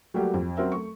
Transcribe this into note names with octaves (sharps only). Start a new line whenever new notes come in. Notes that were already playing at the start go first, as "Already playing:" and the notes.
F#3 G3 A3 A#3 F#4 G4
F2
F#3 C4 C#4 A#4 E5
A3 C#6